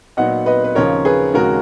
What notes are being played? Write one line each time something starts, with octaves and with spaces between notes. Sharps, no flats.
A#2 F#3 B3 D#4 D#5 F#5
B4 D#5
B4
D#2 C#3 F3 A#4 C#5
G#4 B4
D#2 C#3 G#3 C#4 F#4 A#4